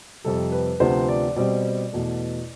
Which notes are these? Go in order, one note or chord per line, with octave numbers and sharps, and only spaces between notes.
F2 C3 G3 A4
B4
D2 C3 F3 B3 C5
D5
B2 G3 C4 D5
E2 B2 A3